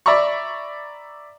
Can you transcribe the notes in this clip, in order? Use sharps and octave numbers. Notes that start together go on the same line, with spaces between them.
D5 E5 A#5 B5 C#6